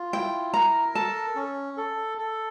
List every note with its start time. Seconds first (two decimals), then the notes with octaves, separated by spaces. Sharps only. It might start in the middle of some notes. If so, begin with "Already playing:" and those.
Already playing: F4
0.13 E4 G5
0.54 A#4 A#5
0.95 A4 A5
1.35 C#4
1.77 A4
2.18 A4